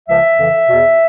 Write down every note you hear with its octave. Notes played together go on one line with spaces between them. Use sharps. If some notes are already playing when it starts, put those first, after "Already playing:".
C#2 C#3 F3 E5
F2 C#3 E3
E2 B2